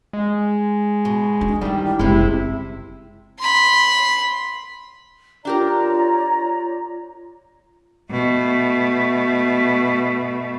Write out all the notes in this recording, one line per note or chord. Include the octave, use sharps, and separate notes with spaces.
G#3
B2
D4
D#3 E3 G3
F#1 C3 G#3 E4
B5 C6
D4 F4 G4 A#4 C#5 D5 A#5
B2 A3